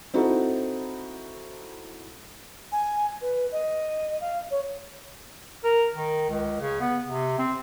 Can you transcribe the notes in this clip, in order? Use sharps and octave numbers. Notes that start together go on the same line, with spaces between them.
C4 D#4 E4 F#4 A4
G#5
B4
D#5
F5
C#5
A#4
D#3
C#2
C#3
B3
C3
C4